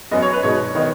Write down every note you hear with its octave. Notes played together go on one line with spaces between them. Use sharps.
F#2 F#3 B3 D#5
C#5
B4
B2 G#3 D#4 C#5
D#3 B3 D#4